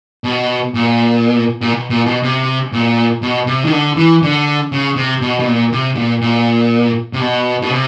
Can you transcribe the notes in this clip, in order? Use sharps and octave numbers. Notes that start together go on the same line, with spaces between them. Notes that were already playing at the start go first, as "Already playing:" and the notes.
B2
A#2
A#2
B2
A#2
B2
C3
A#2
B2
C3
D#3
D3
E3
D3
C#3
C3
B2
B2
A#2
C3
A#2
A#2
C3
B2
B2
C3